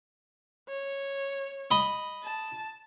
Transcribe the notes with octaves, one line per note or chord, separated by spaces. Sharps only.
C#5
D#5 B5
A5